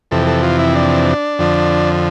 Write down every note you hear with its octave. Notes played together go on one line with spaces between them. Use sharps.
F2 C3 E3 A4
A4
F4
E4
D4
F2 D3 F3